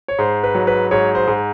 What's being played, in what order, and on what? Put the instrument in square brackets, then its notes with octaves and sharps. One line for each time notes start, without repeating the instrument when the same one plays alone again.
[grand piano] C#5
G#2 C5
B4
F#3
B4
G#2 C#5
C5
G#2